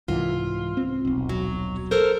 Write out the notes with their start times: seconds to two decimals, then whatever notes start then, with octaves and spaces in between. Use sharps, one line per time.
0.08 C2 G#2 E3 F4
0.77 C4
1.05 D#1 B1
1.29 F#3
1.91 A4 A#4 C5